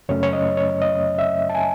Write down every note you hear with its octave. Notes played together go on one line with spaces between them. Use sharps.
F#2 C#3 F#3 A3 C#4 C#5
C#5
D#5
C#5
D#5
E5
A5
G#5